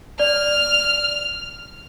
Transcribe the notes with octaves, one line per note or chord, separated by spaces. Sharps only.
D5 F6